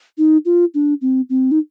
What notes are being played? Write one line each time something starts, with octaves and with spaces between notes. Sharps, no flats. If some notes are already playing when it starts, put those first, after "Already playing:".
D#4
F4
D4
C4
C4
D#4